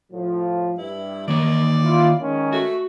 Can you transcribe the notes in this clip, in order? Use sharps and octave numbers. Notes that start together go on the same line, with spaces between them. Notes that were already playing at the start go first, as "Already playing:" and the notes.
A2 F3
G2 E4
D#3 A#3 C#5 D5
E4 F4
D#3 G#3 C#4
A3 F#4